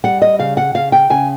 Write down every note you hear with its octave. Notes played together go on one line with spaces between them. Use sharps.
G3 F#5
D#5
C#3 F5
F#5
C#3 F5
G5
C#3 G#5